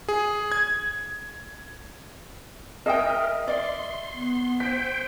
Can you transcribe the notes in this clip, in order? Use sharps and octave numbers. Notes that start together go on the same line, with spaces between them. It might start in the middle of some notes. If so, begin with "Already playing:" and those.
G#4
G#6
G#4 A#4 D#5 E5 G5 D#6
D5 C6
B3
C5 G5 B6